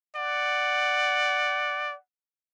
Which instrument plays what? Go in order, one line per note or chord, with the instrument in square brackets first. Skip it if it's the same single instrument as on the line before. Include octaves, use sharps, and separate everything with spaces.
[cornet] D5 [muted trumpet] F#5